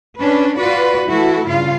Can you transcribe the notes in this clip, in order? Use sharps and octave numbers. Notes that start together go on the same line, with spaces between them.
C#4 D4 B4
F4 F#4 B4 D5
E3 A3 E4 F#4 A4
G2 C#3 F4 F5